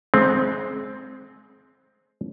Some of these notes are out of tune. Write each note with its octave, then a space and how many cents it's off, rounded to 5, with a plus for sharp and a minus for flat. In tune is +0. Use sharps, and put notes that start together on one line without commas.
G#3 +30 C4 +0